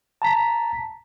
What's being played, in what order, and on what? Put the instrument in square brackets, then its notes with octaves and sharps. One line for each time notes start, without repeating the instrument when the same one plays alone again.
[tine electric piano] A5 A#5 B6